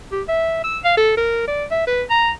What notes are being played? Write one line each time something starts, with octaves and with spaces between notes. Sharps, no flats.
G4
E5
E6
F5
A4
A#4
D5
E5
B4
A#5